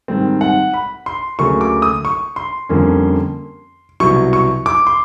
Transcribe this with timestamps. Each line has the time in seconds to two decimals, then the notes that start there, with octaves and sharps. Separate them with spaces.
0.08 G#2 D#3 G3 C4
0.41 F#5
0.74 B5
1.06 C6
1.39 D2 C#3 F#3 A#3 C#6
1.61 D6
1.82 D#6
2.05 C#6
2.36 C6
2.69 F2 D3 G3 A#3 C#4
4.00 C2 B2 F#3 C#6
4.33 C#6
4.66 D6
4.87 C6